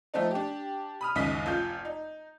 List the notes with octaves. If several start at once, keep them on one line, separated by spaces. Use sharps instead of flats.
F3 A3 C4 D#4
D4 G4
B5 D#6 F6
F#1 C#2 D#3 D#5 D#6 B6
F1 F4 G6
D#4